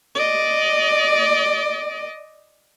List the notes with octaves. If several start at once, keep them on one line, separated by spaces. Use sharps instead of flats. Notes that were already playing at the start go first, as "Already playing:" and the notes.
D5 D#5